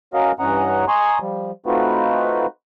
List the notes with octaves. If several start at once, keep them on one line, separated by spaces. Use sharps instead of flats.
C#4 F#4 A#4 D#5 F5
G2 E3 C#4 D#5 F#5 A#5
D#5 G#5 A#5 C6 C#6 D#6
F3 G3
A3 C4 D#4 F4 F#4 B4